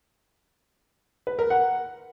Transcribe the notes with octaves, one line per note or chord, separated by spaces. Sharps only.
B4
A#4
F#5